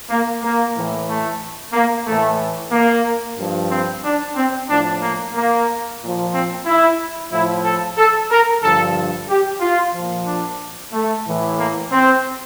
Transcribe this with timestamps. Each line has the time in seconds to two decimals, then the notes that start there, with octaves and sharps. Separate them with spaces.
0.09 A#3
0.42 A#3
0.75 A2 E3
1.08 A3
1.73 A#3
2.06 A2 E3 A3
2.71 A#3
3.37 G2 F3
3.71 C4
4.04 D4
4.35 C4
4.69 A2 F3 D4
5.02 A#3
5.34 A#3
6.00 A#2 F3
6.33 C4
6.66 E4
7.31 A2 F3 E4
7.64 A4
7.97 A4
8.30 A#4
8.63 G2 D3 F3 A4
9.28 G4
9.61 F4
9.93 A#2 F3
10.26 D4
10.92 A3
11.25 A2 E3
11.58 A#3
11.90 C4